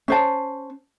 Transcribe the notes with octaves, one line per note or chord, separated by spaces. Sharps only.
C#4 C5 A5